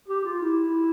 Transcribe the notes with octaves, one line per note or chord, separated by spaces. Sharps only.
G4
F4
E4